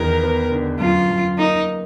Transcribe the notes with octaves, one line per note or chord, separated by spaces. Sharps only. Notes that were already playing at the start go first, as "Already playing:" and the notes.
Already playing: E2 D#3 A#4
B3
D3
F#2 F4
F#2
A#3 D#4